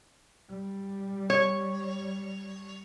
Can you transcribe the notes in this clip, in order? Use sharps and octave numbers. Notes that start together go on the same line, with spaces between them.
G3
C#5